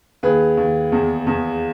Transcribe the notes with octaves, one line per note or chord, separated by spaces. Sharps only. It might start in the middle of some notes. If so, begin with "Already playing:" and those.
D#2 G#4 B4
D#2
E2
E2